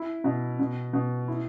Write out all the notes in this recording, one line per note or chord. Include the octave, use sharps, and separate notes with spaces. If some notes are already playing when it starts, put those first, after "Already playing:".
Already playing: E4
B2
B2
B2
E4